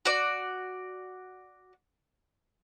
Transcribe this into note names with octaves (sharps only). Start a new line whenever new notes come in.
F#4 D5